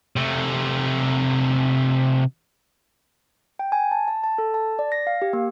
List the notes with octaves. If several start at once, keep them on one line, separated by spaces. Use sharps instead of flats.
C3 A3
G5
G#5
A5
A5
A5
A4
A5
D5
A#6
F5
G4
A#3